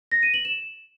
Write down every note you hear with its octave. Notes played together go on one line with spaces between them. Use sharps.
A#6
D#7
F#7
E7